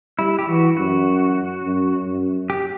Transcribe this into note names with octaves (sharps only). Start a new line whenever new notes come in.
G3 E4
G4
E3 F#4
F#2 F#4
F#2
F#2
G4